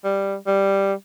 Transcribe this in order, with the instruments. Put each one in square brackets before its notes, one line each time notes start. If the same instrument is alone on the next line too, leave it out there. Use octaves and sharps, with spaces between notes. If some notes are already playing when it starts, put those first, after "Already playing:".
[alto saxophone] G3
G3